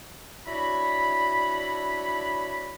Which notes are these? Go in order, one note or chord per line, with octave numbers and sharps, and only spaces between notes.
D4 E4 F#4 C#5 B5